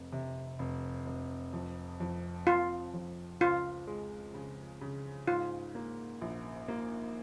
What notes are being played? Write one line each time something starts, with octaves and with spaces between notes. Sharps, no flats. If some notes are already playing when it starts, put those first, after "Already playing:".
Already playing: F1
C3
F1
F1
F2
F2
F2 F4
F2
C#2 F4
G#3
C#3
C#3
G#2 F4
A#3
A#1
A#3